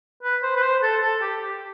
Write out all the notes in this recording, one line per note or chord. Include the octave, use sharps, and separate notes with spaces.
B4
C5
B4
C5
A4
A4
G4
G4